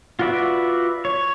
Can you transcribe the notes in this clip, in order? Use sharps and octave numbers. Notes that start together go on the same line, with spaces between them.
F4 F#4 B4 D5 E5
C#5